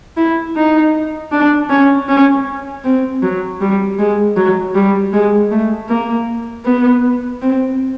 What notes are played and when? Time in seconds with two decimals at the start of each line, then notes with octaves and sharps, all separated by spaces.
0.17 E4
0.56 D#4
1.32 D4
1.70 C#4
2.09 C#4
2.85 C4
3.22 F#3
3.61 G3
3.99 G#3
4.36 F#3
4.75 G3
5.13 G#3
5.51 A3
5.89 A#3
6.65 B3
7.42 C4